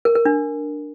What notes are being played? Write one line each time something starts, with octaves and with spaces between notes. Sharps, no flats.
A#4
A#4
D4